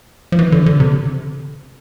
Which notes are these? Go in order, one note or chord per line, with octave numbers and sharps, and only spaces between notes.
F3
E3
D3
D3
C3